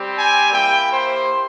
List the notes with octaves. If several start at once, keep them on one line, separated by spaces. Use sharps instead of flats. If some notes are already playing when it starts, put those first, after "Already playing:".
Already playing: G3 C4 G4
G#5
A#3 E4 G4 G5
C5